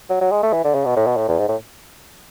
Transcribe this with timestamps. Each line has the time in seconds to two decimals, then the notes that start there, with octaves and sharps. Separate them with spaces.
0.10 F#3
0.21 F#3
0.32 G#3
0.43 A3
0.53 E3
0.64 D3
0.74 C#3
0.85 B2
0.96 A2
1.07 B2
1.17 A2
1.28 E2
1.39 G#2
1.48 A2